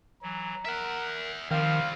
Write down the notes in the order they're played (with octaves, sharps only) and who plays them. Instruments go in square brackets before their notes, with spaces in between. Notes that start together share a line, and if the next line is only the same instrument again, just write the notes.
[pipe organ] E3 F#3 [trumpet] A#5
[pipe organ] A#4 [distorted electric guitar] E5 F#5
[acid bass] D#3 [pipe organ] F3 F6 [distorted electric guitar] G3 C4 [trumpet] F5